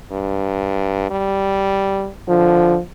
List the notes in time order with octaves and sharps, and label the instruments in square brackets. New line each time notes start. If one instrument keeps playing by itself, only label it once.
[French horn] G2
G3
[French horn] D3 [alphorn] F3